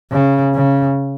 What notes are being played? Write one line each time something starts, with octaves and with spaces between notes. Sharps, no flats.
C#3
C#3